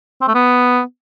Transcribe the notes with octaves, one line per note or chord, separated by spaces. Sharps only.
C4
A3
B3